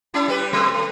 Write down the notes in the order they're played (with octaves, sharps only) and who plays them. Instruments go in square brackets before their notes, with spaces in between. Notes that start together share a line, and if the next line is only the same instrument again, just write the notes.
[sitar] G3 C#4 E4
G3 G4 B4
F#3 A3 C4
A3